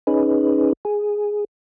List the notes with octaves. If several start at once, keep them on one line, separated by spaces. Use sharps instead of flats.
C#4 D#4 G#4 B4
G#4